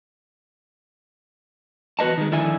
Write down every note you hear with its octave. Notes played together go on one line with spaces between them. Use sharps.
E2 F#4 B4 D#5 A5
D#3 G#3
F2 D3 D#3 E4 E5 G#5